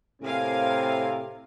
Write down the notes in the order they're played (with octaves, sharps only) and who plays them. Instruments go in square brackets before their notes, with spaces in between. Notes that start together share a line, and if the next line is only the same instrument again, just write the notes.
[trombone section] A2 C3 C4 [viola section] A#4 F5 G#5